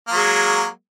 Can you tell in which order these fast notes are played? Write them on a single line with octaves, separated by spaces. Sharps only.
A#3 F#3 G#3